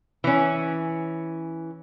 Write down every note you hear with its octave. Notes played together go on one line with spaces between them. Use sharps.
E3 C#4